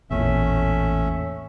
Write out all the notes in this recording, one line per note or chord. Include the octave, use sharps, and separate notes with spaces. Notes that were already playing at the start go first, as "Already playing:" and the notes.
A1 E2 A#2 A3 C#4 E5